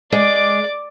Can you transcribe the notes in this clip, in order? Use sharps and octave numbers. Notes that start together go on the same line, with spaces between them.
G#3 D5 D6